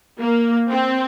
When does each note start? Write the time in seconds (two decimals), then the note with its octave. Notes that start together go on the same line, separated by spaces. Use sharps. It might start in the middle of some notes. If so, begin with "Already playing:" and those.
0.19 A#3
0.69 C4